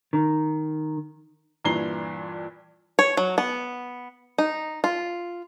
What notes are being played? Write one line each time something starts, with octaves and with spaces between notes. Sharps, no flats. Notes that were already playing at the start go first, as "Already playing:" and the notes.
D#3
G2 A#2 E3 A#5 C7 G7
C#5
F#3
B3
D#4
F4